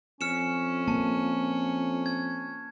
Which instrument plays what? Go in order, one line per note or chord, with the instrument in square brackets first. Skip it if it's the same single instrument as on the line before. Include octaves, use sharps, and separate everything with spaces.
[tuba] F2 [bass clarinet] C#4 [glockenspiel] F6 C#7 E7
[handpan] A#3 [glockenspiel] A5
[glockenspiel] G#6